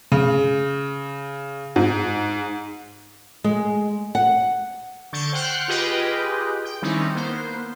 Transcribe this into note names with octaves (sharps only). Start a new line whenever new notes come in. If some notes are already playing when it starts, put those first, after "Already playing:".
C#3
G#2
G#3
F#5
D3 C#6 G6 A6
C5 F#5 G5 F6 F#6
F4 G4 G#4 B4 D#5 G5
G5
D#3 G3 C4 C#4 D#4 E4
A#3 B3 C5